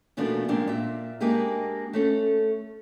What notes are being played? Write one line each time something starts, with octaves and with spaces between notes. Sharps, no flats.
E2 B2 F3 A3 A#3 D4
F3 G3 G#3 A#3 C4 D4
A#2 E5
G#3 A#3 D4 G4 G#4
A3 C#4 A4